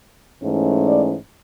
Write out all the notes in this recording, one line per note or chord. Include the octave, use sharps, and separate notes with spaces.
G#2 E3 A3 C#4
D5